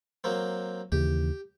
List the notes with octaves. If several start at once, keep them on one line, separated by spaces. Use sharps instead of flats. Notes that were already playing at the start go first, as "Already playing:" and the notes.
F#3 A#3 C4
D#2 C#3 E3 G4